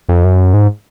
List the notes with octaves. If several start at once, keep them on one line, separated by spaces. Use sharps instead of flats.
F2
F#2
G#2